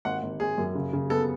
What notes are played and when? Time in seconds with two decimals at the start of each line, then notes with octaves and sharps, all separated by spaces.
0.05 G#1 F#5
0.23 G#1
0.40 G#1 G#4
0.58 F#2
0.75 C#3
0.93 C#3
1.10 B3 A4